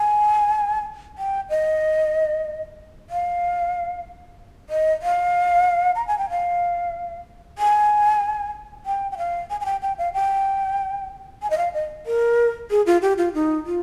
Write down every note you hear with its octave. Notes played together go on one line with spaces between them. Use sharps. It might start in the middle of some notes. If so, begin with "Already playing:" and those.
Already playing: G#5
G5
D#5
F5
D#5
F5
A#5
G#5
G5
F5
G#5
G5
G5
F5
G#5
G#5
G5
G5
F5
G5
G#5
D#5
F5
D#5
A#4
G#4
F4
G4
F4
D#4
F4